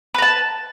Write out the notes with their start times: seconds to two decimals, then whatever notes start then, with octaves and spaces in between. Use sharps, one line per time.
0.14 B4
0.18 A#5
0.22 A5